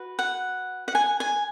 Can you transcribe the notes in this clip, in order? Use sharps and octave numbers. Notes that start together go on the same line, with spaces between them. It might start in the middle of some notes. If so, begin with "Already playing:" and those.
Already playing: F#4 B4
F#5
F#5
G#5
G#5